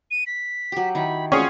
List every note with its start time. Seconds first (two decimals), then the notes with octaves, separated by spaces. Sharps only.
0.11 D#7
0.27 B6
0.72 F#3 G4
0.95 D#3 E4 B5
1.32 C4 C#4 F4 F#4 G#4 C#6